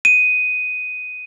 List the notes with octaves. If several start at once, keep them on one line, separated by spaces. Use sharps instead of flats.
D#7